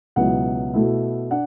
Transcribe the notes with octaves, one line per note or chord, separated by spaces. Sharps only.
C#2 B2 F#3 B3 E4 F#5
B2 A3 E4
D4 F#5